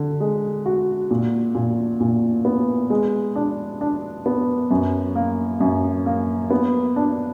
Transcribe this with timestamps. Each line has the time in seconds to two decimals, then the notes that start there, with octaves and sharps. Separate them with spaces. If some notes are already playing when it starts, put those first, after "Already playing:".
Already playing: D3
0.20 G#3
0.66 F#4
1.11 A#2
1.55 A#2
2.00 A#2
2.45 B3
2.90 G#3
3.36 D4
3.81 D4
4.26 B3
4.71 F#2
5.16 A#3
5.60 F#2
6.06 A#3
6.50 B3
6.96 D4